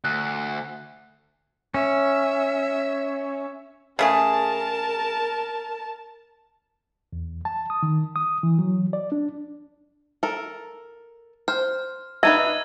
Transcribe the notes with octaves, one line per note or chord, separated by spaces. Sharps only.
D2 F#6
C#4 E5
C#3 A3 G#4 A#4 A5
E2
A5
D#6
D#3
D#6
E3
F#3
D5
D4
A4 A#4
C5 F6
D4 D#4 B4 E5 E6 G#6 D#7